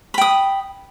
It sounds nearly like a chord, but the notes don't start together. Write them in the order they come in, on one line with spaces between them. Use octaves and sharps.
B5 G5 D#6